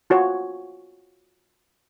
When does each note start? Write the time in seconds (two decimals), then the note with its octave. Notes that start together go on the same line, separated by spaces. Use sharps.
0.10 F4 F#4 C#5